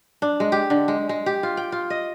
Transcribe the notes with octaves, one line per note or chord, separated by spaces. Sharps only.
D4
G#3
G4
D3
G#3
G#3
G4
F4
G5
F4
D#5